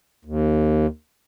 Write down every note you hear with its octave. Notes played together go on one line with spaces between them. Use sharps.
D#2